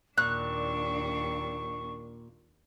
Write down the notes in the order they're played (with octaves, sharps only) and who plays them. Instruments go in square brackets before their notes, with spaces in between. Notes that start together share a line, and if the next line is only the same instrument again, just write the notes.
[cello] D#2 D4 [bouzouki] A#2 [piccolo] C#6 [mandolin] F#6